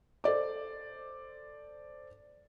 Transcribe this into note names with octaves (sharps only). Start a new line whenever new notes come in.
A4 C5 D5 D6